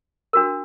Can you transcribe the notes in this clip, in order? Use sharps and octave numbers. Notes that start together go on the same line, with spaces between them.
D4 F#4 A#4